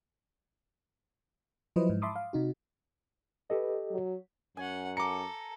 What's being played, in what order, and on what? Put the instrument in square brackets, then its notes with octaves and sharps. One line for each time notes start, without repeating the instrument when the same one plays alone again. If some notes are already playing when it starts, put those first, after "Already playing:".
[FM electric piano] F3 F#3 E4 B4 C5 D#5
G#2
E5 A5 B5 C6 D6 D#6
F5
C3 D#4 F#4
[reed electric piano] G4 A4 D#5 [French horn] B4
[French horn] F#3
[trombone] F#2 [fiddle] C#4 F#5 [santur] G#5
[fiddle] A4 [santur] A#5 [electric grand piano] D6 C#7